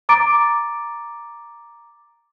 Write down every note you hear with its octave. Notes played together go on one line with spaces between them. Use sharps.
A#5 D6 A6 D7